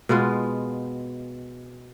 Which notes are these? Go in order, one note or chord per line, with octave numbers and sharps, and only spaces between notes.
B2 G#3 B3 F4